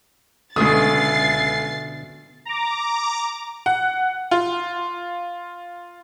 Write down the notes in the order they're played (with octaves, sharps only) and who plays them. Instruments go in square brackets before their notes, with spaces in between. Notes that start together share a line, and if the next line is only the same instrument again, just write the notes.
[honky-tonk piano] C#2 D#6 [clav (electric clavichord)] B2 D3 [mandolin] A3 E5 [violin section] A6 C7
[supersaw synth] A#5 D6
[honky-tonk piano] F#5
F4